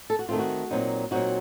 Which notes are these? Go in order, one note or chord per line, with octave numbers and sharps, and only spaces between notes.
A4
F#4
D#3 A3 C4 F4
F#4
A#2 F#3 C4 D#4
A#2 F#3 C4 D#4 F#4